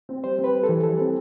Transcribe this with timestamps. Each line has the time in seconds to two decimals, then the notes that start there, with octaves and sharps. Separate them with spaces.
0.09 C4
0.24 G3 C5
0.39 C4
0.44 B4
0.54 G3
0.64 A4
0.69 E3
0.84 G3 A4
0.99 C4